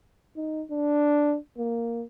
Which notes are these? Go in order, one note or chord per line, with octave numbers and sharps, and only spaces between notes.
D#4
D4
A#3